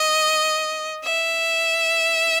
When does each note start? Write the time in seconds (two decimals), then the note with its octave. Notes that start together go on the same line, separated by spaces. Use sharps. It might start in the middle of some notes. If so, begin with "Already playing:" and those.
Already playing: D#5
1.04 E5